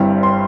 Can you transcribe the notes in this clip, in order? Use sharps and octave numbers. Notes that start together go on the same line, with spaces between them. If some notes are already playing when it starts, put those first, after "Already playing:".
Already playing: G1 G2 G3 C4 E4
C6